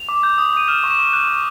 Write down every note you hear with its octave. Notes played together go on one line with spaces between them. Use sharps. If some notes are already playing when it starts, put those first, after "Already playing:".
Already playing: F7
D6
G6
D#6
D#6 D#7
F6 E7
C#6
E7
C#6
F#6 E7
C#6